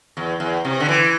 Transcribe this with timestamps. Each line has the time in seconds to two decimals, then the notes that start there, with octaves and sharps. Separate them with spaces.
0.17 E2
0.40 E2
0.65 C3
0.80 D3
0.89 E3